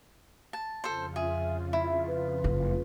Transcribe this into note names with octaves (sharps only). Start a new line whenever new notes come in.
A5
F2 C#3 F4 A4 C5
G#4 E5
E4 E5
B4
F#1 F#2